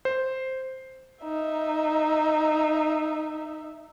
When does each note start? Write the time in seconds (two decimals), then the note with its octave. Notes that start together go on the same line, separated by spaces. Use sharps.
0.05 C5
1.24 D#4 E5